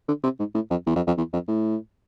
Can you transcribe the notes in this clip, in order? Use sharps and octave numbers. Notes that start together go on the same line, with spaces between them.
D3
C3
G#2
A2
F2
E2
F2
F2
E2
F2
A2